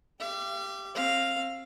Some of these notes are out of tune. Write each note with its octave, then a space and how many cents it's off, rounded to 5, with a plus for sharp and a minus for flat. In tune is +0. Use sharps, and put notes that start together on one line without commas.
G4 +0 F5 -45
C4 +30 F5 +0